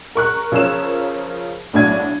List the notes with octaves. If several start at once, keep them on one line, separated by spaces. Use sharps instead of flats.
A#4 C#6 F#6
C#3 F3 A#4 C#5 E6 E7
B1 A2 D4 F#4 G#6 D#7